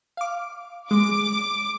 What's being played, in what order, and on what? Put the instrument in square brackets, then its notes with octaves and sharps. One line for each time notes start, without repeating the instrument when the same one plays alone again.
[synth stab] F5 D6
[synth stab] G#3 [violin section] D6